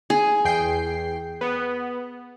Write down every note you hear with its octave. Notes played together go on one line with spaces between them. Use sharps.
G#4
E2 G5 C7
B3